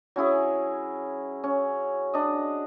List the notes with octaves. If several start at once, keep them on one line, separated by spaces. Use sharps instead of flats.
F#3 C#4 E4 G#4
C#4
D4 D#5